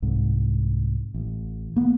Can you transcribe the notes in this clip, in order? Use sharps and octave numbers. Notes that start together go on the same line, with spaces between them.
C2 G#2
A1
A#3 B3